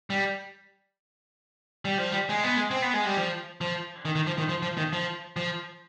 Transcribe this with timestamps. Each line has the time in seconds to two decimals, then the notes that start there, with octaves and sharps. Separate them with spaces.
0.10 G3
1.85 G3
1.98 F3
2.12 G3
2.29 G#3
2.44 B3
2.57 G#3
2.71 C4
2.82 B3
2.94 G#3
3.05 G3
3.17 F3
3.61 F3
4.05 D#3
4.16 D#3
4.27 F3
4.38 D#3
4.49 F3
4.63 F3
4.77 D#3
4.93 F3
5.37 F3